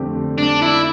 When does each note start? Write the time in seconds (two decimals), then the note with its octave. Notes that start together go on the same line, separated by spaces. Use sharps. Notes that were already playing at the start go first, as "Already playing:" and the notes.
Already playing: F2 D3 A3 C4 G4
0.38 D4
0.62 E4